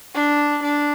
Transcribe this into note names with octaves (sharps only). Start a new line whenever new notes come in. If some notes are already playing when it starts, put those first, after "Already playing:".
D4
D4